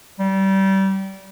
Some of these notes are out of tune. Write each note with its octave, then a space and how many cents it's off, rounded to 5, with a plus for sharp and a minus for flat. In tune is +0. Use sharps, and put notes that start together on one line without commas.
G3 -25